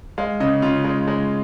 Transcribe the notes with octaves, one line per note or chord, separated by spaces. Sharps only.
G#3 F5
C#3 D#5
C#3 F4
G#3
G#3